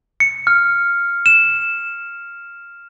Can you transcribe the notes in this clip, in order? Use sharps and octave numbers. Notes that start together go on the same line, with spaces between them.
C#7
F6
E7